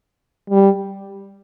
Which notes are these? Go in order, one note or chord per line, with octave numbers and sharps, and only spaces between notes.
G3